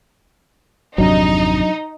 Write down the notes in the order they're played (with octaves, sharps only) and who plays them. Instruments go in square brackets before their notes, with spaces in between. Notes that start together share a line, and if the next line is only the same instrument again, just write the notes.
[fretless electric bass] G#1 F2 C3 [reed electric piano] F#3 D4 [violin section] D#4